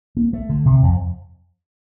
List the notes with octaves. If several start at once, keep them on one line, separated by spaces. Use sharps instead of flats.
A#3
A3
D3
C3
F2